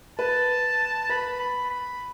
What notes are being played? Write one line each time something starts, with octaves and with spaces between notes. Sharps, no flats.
B4 A5
B4 B5
B5
B5